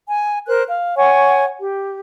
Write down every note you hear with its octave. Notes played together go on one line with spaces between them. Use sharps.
G#5
A#4 C5 F#6
F5
C#5 F#5 G#5 C#6
G4